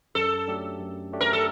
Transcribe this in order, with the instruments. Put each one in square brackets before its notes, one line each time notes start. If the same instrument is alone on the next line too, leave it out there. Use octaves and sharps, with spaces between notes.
[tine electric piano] F#2 [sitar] A4
[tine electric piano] F#3 A3 D4 G4
F#2
F#3 A3 D4 G4
[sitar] A#4
A4